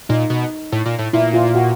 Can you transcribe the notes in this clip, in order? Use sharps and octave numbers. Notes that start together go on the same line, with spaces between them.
A#2 D#4
B2
A2
A#2
A2
A#2 E4
F4
F#4